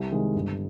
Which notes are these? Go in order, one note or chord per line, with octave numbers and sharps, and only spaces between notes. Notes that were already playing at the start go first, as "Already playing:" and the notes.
Already playing: C2
C3 D#3 G#3
G1